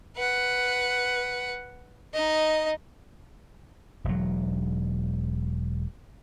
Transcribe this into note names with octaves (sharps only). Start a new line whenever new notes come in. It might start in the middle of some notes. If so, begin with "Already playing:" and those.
B4 F#5
D#4 D#5
E1 F#3